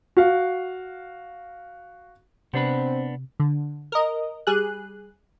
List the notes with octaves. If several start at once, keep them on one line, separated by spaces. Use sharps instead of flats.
F#4 F5
C3 B3 C4 D4 B4
D3
A#4 D#5
G3 G#4 F#6